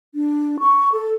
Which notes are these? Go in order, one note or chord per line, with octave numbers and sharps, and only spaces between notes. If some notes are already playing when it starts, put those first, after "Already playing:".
D4
C#6
A4